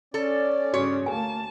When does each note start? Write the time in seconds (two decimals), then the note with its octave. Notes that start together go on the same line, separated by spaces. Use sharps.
0.14 C#4 A4 D5
0.74 G2 C#3 F#4 C#5
1.06 D2 A#3 G#5 A5